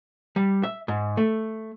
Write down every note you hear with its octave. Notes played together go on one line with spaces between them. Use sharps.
G3
E5
G#2
A3